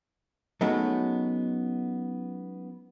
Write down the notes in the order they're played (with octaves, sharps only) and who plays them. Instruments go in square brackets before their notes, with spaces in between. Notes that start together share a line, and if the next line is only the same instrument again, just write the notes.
[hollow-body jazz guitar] F#3 G#3 A3 B3 C#4 D#4